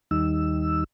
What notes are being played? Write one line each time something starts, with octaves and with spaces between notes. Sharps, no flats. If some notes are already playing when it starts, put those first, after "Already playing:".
D#2 D#3 G3 D#4 E6